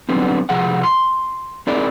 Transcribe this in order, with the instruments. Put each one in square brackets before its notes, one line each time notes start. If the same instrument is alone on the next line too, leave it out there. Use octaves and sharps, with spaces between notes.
[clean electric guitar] D3 F#3 G3 B3 C4
C#2 C3 F3 G#4 F5 F#5
C6
C4 E4 G#4 A#4 D5